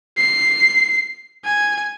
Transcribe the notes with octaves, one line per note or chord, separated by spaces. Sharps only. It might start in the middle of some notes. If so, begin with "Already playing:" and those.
C7
G#5